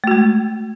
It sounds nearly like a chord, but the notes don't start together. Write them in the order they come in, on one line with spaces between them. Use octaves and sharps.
A3 F#4 G#3